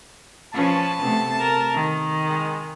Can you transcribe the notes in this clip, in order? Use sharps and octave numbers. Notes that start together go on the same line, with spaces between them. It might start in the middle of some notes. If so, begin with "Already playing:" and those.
F3 C#4 B4 A5
C3 A3 B3
A#4
D#3
G#3